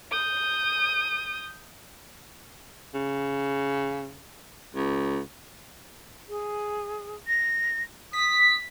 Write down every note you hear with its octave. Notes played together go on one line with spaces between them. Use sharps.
D#6 G6
C#3
C#2
G#4
A#6
D#6 B6